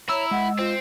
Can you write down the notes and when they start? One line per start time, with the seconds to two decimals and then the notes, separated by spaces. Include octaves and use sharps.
0.09 E4 C#5 A#5 E6
0.31 G#3 F#5
0.58 C4 F4